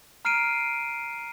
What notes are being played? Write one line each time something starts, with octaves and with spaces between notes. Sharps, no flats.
A#5 F6 C7 D7 D#7